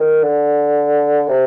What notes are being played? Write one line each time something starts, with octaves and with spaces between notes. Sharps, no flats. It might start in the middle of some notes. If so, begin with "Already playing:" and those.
Already playing: D#3
D3
C3